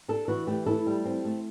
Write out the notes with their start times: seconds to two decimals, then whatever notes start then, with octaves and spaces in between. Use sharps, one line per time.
0.08 D4 A4
0.28 E3 F#4
0.47 A3 G4
0.66 E4 A4
0.86 G3
1.05 C4
1.25 A3